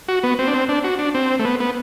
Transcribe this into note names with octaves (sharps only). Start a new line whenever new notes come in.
F#4
B3
C4
D4
C4
D4
F#4
D4
C4
A3
B3
B3